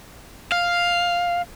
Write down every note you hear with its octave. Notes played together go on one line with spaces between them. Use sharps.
F5